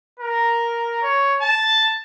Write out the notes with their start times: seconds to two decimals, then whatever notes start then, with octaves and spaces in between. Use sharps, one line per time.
0.19 A#4
1.02 C#5
1.41 A5